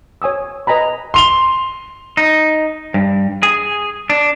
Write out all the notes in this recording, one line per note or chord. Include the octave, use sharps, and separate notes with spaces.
C#5 G#5 D#6 E6
B4 D#5 G#5 A#5 B5
C6 F7 G7
D#4
G2
G#4
D4